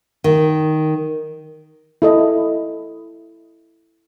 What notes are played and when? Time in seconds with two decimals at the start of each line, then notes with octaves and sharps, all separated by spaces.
0.24 D#3
2.02 E4 A4 D#5